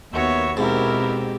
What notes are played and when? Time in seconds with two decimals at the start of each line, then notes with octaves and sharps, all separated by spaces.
0.13 D#2 B3 F#4 C#5 E5
0.57 G#2 B2 C4 E4 G4 A#4